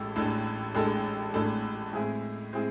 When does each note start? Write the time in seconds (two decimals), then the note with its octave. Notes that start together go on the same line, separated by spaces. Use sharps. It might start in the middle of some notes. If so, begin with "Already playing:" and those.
Already playing: A1 A2 G#3 A4
0.16 A1 A2 G#3 D4 A4
0.75 A1 A2 G#3 D4 A4
1.34 A1 A2 G#3 D4 A4
1.93 A2 G#3 C4 E4 G#4
2.53 A2 G#3 C4 E4 G#4